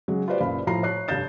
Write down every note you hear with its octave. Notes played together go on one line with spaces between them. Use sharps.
C#3 F#3 G#3
F4 G4 B4 C5 D5
F#1 C#2 A#2 F5 B5
A2 F3 F4 A#5 C7
C#5 F#6 C7
F1 G2 F5 G6 A6 E7